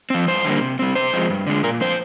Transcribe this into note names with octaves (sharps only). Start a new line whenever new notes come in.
F3 C4
G2 C5
D3 G3 A#3
C3
G3 C4
C3 C5
F3 G#3 C4
G2
D3 G#3
A#2 A#4
F3 C4 C5